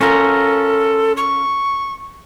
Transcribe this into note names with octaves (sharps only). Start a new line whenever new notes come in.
C#4 F4 A4 A#4
C#6